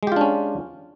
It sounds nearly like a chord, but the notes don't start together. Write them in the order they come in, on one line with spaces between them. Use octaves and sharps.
G#3 G4 F4 D4 C#4